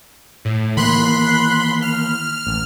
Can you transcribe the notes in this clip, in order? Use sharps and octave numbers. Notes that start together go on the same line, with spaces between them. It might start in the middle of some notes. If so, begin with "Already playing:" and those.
A2
D#3 E3 A#3 B5 C6 F#6
F6
A1